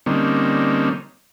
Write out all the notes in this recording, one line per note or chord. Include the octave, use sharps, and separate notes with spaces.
D3 G3 A#3 C4 C#4 D#4